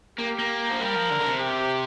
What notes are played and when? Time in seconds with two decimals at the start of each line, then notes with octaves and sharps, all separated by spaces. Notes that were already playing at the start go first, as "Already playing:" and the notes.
0.19 A#3 G4
0.39 A#3
0.70 F3
0.80 G3 A#4
0.95 F3
1.10 D3
1.20 D3
1.25 C3
1.41 G4